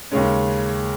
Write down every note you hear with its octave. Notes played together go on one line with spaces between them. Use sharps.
D#2 C#3 G#3 C#4